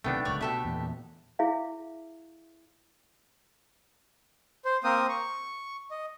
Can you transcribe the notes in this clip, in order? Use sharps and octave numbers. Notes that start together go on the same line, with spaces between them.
B1 C3 D#3 A3 B3 D4 G5
D1 C#2 C#5 D5
B2 G4 A4 E5
E2 A#2
E4 G#4 C#5 E5 F5
C5
A#3 C4 A#4 C5 D#6
C#6
D#5